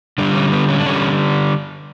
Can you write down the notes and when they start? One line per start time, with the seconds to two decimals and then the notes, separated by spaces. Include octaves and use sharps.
0.18 D3 G3 D4
0.35 C#4
0.52 B3
0.69 C#4
0.79 D4
0.86 D3 G3 C#4